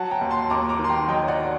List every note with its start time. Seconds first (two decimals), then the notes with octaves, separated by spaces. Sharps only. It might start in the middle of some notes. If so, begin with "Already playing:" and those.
Already playing: F#3 F#5 A5
0.11 G5 A#5
0.21 D#2
0.31 A5 C6
0.50 D#2 A#5 D6
0.69 A#5 D6
0.79 D#3
0.84 C6
0.90 G5 A#5
1.08 F#3 D#5 G5
1.28 D5 F#5